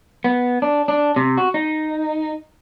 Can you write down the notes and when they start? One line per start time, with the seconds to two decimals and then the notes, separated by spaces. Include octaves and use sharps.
0.24 B3
0.62 D4
0.88 D4
1.16 C3
1.37 F#4
1.54 D#4